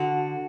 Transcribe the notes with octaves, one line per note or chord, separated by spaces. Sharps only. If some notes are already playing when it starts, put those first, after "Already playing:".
Already playing: D3 F#4